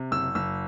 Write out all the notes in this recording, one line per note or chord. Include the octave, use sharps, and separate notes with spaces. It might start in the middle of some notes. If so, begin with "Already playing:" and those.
Already playing: C3
F#1 E6
F#1 E6